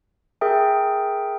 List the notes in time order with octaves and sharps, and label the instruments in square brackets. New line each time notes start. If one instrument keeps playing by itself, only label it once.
[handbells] G#4 A#4 E5 G5